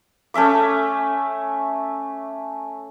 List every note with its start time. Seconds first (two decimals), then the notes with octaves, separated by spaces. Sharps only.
0.34 A3 C#4 E5 D6